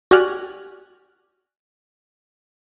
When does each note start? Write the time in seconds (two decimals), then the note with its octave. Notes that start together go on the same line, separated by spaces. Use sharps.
0.11 F#4 G4 D5 G#5 F6 F#6